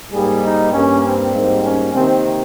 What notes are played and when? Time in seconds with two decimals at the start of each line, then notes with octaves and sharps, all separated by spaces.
0.11 G#2 G3 A#3 G#4
0.42 D#4
0.71 G2 G3 A#3 C#4
1.03 C4
1.32 G#2 G3 A#3
1.62 C#4
1.92 C3 D#3 A#3 C4